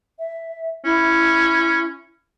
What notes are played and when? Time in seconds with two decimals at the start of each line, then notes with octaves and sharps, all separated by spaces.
0.19 E5
0.85 C#4 E4